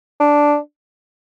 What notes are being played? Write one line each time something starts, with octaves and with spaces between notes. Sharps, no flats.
D4